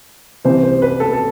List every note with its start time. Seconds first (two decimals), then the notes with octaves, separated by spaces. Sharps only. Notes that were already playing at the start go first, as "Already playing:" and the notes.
0.45 C2 C3 E3 C5
0.63 C5
0.82 B4
1.00 A4
1.13 A4